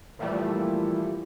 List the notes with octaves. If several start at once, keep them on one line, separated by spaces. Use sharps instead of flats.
A#2 E3 F3 G3 A3